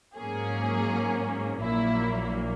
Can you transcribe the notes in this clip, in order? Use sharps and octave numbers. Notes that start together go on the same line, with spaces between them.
G#2 F#3 A#3 C#4 G#4
A#1 A#2 F#3 A#3 E4